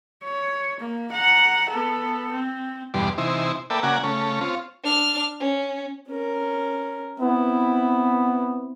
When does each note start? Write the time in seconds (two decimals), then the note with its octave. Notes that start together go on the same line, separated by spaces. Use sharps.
0.24 C#5
0.80 A#3
1.11 F#5 A#5
1.70 B3 A4
2.32 C4
2.94 E2 G2 B2 G3 D5 C6
3.18 C3 E3 D#4 E4 C5
3.70 A#3 A4 B4 D5 E5 G5
3.83 C#3 A#3 F#4 D5 F#5 G#5
4.03 C#3 A3 C#4
4.41 C4 F4 C#5
4.83 D4 F6
5.40 C#4
6.09 C#4 A#4
7.20 B3 C4 E4